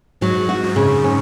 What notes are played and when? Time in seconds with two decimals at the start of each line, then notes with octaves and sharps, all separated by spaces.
0.21 G#2 F#3
0.49 F#4
0.63 F#2
0.76 C#3
1.04 C#4